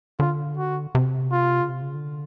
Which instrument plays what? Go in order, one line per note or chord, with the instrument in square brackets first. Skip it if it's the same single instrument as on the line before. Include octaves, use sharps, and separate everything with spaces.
[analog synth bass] D3 [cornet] F4
[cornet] F#4
[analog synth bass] C3
[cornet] F4
[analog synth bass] C#3
C3
C#3
D3